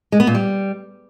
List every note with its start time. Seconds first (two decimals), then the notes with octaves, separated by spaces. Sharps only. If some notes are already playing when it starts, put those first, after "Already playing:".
0.12 G#3
0.20 B3
0.27 A#2
0.35 G3